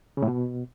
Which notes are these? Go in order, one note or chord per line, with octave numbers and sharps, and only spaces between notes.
C#3
A2
B2